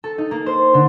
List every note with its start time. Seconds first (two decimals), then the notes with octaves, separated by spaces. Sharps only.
0.04 A4
0.18 D#4
0.31 A#3
0.46 C5
0.74 D3